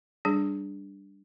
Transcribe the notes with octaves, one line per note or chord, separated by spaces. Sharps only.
G3 D4 G#4